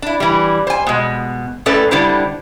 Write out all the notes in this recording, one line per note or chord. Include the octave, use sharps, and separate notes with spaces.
D4 E4
E3 G3
C5 G#5
B2 G#3
A2 C#4 A4 B4 D5
D3 G3 D4 E4 G4 C5